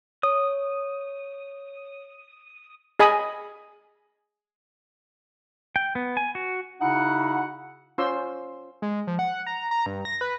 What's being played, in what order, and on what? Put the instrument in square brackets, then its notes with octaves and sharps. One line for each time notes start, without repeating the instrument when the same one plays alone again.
[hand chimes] C#5 [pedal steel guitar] D#6
[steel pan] G#4 D#5 G#5 B5 D#6
[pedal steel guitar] G5
B3
G#5
F#4
[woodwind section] C#3 D#4 E4 F#4 F#5
[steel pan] C#4 F4 C5 C6 E6
[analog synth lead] G#3
F3
F#5
A#5
A#5
G2
A#6
B4